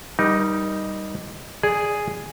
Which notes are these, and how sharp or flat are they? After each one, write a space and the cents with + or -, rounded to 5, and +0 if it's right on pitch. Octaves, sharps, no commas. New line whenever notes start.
G3 +0 D#4 +0 A#4 +30
G#4 +0 D5 +0